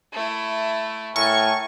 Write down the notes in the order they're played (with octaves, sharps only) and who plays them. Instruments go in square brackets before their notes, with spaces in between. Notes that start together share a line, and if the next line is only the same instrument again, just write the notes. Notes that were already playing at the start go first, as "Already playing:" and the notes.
[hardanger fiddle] A3 E4
[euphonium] A2 [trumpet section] A4 A#4 G#5 [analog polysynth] C#6